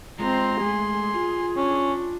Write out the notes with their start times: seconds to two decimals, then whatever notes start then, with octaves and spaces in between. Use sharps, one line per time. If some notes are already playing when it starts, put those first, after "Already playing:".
0.19 G#3 C4 F4 G#4 A#5 C6
0.61 G#3 A3 G#4
1.14 F4
1.57 C#4 D4